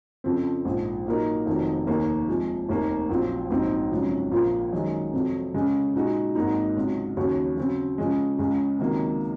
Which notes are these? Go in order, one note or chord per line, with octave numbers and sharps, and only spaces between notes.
F2 C#3 F3 C4
A#1 G#2 F3
A#2 F#3 A#3 D#4 A#4
F1 F2 D#3 F#3
F1 D#2 D#3 A#3
C3 F3 G#3
F1 D#2 D#3 A#3
A#1 A#2 F#3 C4 F4
A#1 G#2 F#3 C4 D#4
G#1 F#2 C#3 F3
A#1 A#2 F3 A#3 F4
F#2 D#3 G#3
F2 C3 F#3
C#3 G#3 C#4
A#2 G#3 D#4 F#4
G#1 G#2 F#3 A#3 D#4
C#2 C3 F#3
D#2 C#3 F#3 C#4 F#4
C#3 F#3 C4
C#3 F3 G#3
C#2 C#3 G#3
C#2 C3 D#3 F#3 A#3